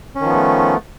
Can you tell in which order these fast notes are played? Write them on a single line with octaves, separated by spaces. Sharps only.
C#4 D#3 F3 B3 A3